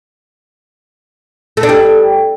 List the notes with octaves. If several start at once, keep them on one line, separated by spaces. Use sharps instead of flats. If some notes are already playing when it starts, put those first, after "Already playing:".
A3
D4
G3